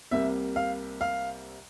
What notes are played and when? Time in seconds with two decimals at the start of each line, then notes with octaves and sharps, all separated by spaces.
0.11 C2 C3 G3 A#3 E5
0.56 F5
1.01 F5